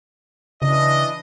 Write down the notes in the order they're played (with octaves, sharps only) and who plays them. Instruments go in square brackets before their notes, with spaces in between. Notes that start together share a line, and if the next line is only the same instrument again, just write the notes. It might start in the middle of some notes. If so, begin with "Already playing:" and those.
[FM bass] C#3 [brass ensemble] E3 D4 D#5